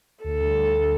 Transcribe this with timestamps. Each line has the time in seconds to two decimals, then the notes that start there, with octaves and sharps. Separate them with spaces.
0.24 D2 A4
0.41 D3 G3